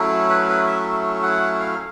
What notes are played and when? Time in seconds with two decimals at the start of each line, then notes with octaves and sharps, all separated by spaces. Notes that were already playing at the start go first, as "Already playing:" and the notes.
Already playing: F#3 A3 C#4 E4
0.29 B4
0.49 B4
0.67 E5
1.23 F#5
1.60 F5